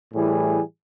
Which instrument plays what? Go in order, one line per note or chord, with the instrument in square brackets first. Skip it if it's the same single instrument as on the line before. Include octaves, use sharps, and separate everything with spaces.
[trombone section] A2 E3 G3 G#4